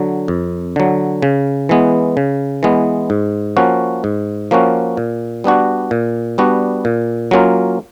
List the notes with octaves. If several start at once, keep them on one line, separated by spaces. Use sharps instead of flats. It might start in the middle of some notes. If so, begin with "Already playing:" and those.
Already playing: D3 F#3
F2
D3 F#3
C#3
E3 G#3 B3
C#3
E3 G#3 B3
G#2
F3 A#3 C#4 F#4
G#2
F3 A#3 C#4 F#4
A#2
G3 B3 D4 F#4
A#2
G3 B3 D4 F#4
A#2
F#3 A#3 C#4 F4